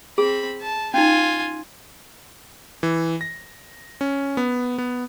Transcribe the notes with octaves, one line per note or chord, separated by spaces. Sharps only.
C4 G#4 B5
A5
C#4 D#4 F4 G#5
E3
A#6
C#4
B3
B3